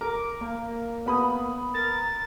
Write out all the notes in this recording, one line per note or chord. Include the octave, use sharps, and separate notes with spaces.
A#4 D6
A#3
B3 B5 D#6
A#4 A6